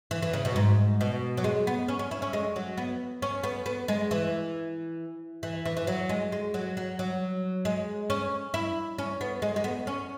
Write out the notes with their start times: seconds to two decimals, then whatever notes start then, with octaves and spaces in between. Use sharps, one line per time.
0.11 E3
0.22 E3
0.33 C#3
0.45 B2
0.56 G#2
1.01 B2
1.37 F#3
1.44 G#3
1.67 B3
1.88 C#4
1.99 C#4
2.11 E4
2.22 C#4
2.33 G#3
2.56 F#3
2.77 B3
3.22 C#4
3.43 B3
3.66 B3
3.88 G#3
4.11 E3
5.43 E3
5.65 E3
5.77 E3
5.87 F#3
6.09 G#3
6.32 G#3
6.54 F#3
6.77 F#3
6.99 F#3
7.65 G#3
8.10 C#4
8.54 E4
8.98 C#4
9.21 B3
9.42 G#3
9.56 G#3
9.64 B3
9.87 C#4